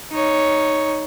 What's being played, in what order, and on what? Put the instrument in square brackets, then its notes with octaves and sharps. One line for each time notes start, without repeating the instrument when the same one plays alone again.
[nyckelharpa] D#4 C#5